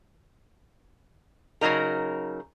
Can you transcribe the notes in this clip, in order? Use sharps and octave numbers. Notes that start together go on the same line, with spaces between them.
C#3 E3 F#3 D#4 A#4